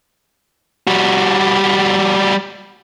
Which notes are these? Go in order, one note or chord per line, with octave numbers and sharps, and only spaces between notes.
G3 F#4